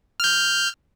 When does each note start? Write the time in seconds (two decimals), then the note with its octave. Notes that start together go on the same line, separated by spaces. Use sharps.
0.20 F6 G6